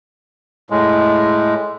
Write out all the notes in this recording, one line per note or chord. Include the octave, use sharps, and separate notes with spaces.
A2 G#3